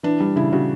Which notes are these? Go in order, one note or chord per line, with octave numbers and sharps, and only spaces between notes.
E3 D4
G3
C#3 E4
C#3 F#4